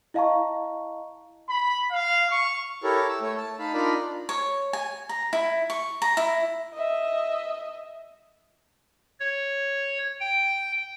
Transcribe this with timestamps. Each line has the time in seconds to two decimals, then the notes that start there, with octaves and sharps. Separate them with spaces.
0.14 E4 D#5 F5 A5 A#5 C#6
1.48 B5
1.91 F5
2.29 C#6
2.83 E4 G4 A4 A#4 C#5
3.09 E6
3.21 A3 C#5
3.37 A5
3.59 D#4 F5 A5 B5
3.74 D4 D#4 F4 A#4 D5 B5
4.29 C#5
4.73 G#5
5.09 A#5
5.33 E4
5.70 C#6
6.02 A#5
6.17 E4
6.74 D#5 E5
9.20 C#5
10.20 G5